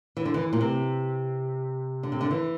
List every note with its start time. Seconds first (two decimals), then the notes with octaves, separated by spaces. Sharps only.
0.17 E3
0.25 D3
0.34 E3
0.53 A#2
0.61 C3
2.03 D3
2.12 C3
2.21 D3
2.31 E3